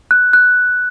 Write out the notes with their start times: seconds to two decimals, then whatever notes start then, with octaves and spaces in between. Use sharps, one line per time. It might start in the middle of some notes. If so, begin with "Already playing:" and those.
0.11 F#6
0.33 F#6